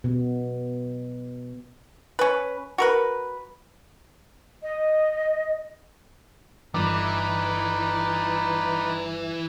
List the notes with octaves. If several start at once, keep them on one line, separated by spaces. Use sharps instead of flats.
B2
C#4 B4
F#4 A#4 B4
D#5
G1 E3 D#4 B4 D5 D6